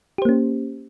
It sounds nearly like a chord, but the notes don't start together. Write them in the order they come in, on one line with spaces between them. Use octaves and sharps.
G4 C5 A#3 C#4